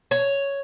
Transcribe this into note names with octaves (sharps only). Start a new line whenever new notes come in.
C#5